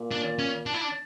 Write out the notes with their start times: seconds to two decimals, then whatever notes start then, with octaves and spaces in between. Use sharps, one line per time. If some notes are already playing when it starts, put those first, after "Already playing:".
Already playing: A#2
0.11 D4
0.39 C#4
0.66 D4
0.74 E4
0.82 D4